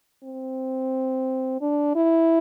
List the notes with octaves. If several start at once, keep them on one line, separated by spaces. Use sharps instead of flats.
C4
D4
E4